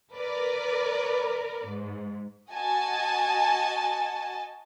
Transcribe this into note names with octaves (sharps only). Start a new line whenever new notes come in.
A#4 B4 D5
G#2
F#4 D#5 G#5 A5